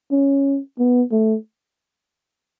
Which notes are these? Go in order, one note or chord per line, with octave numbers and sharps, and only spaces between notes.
C#4
B3
A3